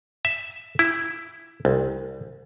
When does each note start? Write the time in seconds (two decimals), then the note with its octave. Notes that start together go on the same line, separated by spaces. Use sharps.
0.25 E5
0.79 E4
1.65 C2